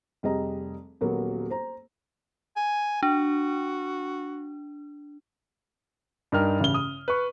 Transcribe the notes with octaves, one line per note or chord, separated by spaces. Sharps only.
F1 G3 G#4 D#5 A#5
D#1 F#3 A#3 B3 F#4
C5 A#5
G#5
D4 F#4
G2 D#4 A#4 G5 F6
A1 C#3 G7
D#6
B4 C#6